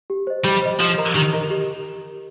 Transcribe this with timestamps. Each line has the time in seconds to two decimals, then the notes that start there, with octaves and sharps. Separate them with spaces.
0.10 G4
0.27 C5 D#5
0.45 G3 G4
0.62 C5 D#5
0.80 F3 G4
0.98 A#4 D#5 A#5
1.16 D#3 G4
1.33 A#4 D#5 A#5
1.50 G4